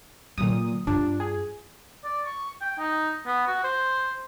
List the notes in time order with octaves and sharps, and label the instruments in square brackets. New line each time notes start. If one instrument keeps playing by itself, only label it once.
[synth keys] A#2 D#6 [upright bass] D3 F#3
[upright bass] G2 F4 [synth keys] D4
[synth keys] G#4
[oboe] D5
C#6
G5
D#4
B3
F#4
C5